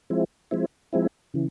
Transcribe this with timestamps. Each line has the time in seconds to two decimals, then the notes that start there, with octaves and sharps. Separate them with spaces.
0.10 F3 G#3 C4 E4
0.51 F3 G#3 C4 E4
0.93 F3 G#3 C4 E4
1.34 C#3 E3